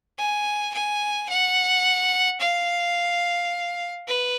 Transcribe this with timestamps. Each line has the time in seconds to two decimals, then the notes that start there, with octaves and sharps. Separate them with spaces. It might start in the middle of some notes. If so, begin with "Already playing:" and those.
0.18 G#5
0.74 G#5
1.29 F#5
2.40 F5
4.08 B4